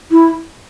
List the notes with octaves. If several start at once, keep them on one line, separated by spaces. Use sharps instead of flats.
E4